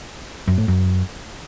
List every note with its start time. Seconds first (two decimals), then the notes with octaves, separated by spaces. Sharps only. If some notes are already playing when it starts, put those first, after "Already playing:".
0.47 F#2
0.58 A2
0.68 F#2